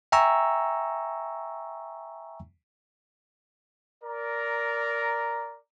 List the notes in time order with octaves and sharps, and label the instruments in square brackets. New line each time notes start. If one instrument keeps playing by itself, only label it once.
[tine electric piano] E5 G5 G#5 A#5 C#6 E6
[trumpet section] A#4 D5 A#5